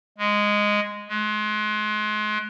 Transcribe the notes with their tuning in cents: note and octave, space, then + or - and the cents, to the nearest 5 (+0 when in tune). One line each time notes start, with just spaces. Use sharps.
G#3 -5
G#3 +35